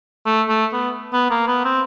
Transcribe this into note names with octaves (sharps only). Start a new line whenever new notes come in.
A3
A3
B3
B3
A#3
B3
C4